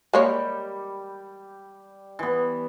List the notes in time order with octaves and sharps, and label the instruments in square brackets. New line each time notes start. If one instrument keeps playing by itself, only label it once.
[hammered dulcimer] G3 G4 [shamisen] G#3 A#3 C#5
[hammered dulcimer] E3 B3